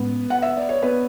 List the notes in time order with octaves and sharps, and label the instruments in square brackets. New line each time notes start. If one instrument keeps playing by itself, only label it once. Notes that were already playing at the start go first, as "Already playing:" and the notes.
Already playing: [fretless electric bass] A2 G#3 C#4 [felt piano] B3 B4
[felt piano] F#5
E5
D5
C#5
B3 B4